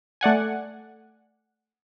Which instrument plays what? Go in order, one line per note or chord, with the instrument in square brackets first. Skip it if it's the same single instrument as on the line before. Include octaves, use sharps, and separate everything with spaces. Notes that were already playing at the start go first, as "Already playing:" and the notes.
[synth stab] A3 D5 F#5 G#5